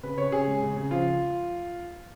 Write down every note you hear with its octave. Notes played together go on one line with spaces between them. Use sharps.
C#3 B4
C#3 C#5
C#4 G#4
G#3
C#3
C#3
F3 F4